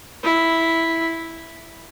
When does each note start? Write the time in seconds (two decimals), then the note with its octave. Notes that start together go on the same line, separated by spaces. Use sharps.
0.24 E4